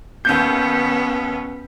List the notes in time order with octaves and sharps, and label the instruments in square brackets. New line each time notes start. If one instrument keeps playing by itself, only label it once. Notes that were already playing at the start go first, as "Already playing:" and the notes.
[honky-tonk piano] D#2 G6 [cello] B3 C#4